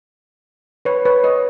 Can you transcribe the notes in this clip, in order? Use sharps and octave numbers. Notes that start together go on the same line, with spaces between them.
B4 C#5
B4 C#5
C#5 D#5